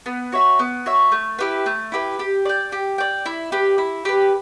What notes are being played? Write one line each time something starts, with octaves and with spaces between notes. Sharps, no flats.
B3
F#4 C#5 E5
B3
F#4 C#5 E5
A3
E4 G4 B4
A3
E4 G4 B4
G4
D5 G5
G4
D5 G5
E4
G4 B4
E4
G4 B4